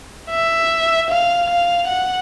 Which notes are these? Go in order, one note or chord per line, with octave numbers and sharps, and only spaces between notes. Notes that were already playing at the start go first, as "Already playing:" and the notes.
E5
F5
F5
F#5